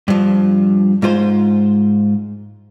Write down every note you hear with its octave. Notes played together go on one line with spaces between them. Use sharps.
G2 F3
G#2 G#3 F4 C5